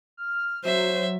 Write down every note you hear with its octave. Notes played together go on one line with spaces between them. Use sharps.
F6
F#3 C5 E5